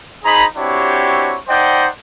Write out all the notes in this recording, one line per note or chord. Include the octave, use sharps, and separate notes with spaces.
D#4 G#4 C5 A#5 B5
C4 D4 E4 F#4 G4 C#5
D#4 C5 D5 D#5 F#5 G5